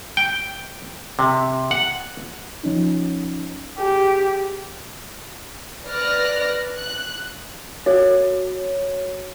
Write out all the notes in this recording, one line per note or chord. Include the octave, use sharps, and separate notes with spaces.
G5
C3
F#5
F3 C#4 D#4
G4 G#4
B4 D5 F6 F#6 A#6
F#6
F#4 C#5